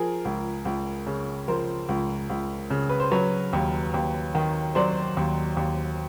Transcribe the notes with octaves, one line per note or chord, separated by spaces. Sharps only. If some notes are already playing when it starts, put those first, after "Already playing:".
Already playing: F3 G#4 A#4
C#2
C#2
C#3
F3 A#4 C5
C#2
C#2
C#3
B4
C5
F#3 B4 C#5
D#2
D#2
D#3
F#3 C5 D5
D#2
D#2